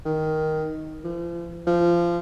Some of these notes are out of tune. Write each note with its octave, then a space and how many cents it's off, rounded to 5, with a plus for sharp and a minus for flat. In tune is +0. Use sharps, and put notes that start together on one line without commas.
D#3 +5
F3 -40
F3 -20